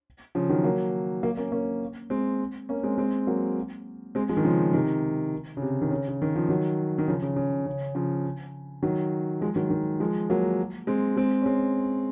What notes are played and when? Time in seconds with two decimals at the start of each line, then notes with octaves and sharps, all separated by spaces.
0.35 C#3 F3
0.49 D#3 F#3
0.64 F#3 A#3
1.23 F#3 A#3
1.37 A#3 C#4
1.52 A#3 C#4
2.10 G#3 C4
2.69 A#3 C#4
2.83 G#3 C4
2.98 G#3 C4
3.27 F#3 A#3
4.15 G#3 C4
4.29 F3 G#3
4.37 D#3
4.45 C#3 F3
4.73 C3 D#3
5.57 C#3
5.62 C3
5.82 D#3
5.91 C#3
6.08 C#3
6.22 D#3
6.36 F3
6.49 D#3 F#3
6.98 D#3
7.08 C#3 F3
7.22 C#3
7.36 C#3
7.67 C#3
7.95 C#3 F3
8.83 D#3 F#3
9.41 F3 G#3
9.56 D#3 F#3
9.70 D#3 F#3
10.00 F3 G#3
10.30 F#3 A#3
10.87 G#3 C4
11.17 G#3 C4
11.42 C#4
11.46 G#3 C4